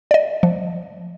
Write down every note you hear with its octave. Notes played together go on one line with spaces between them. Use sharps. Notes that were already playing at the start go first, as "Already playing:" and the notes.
D5 D#5
F3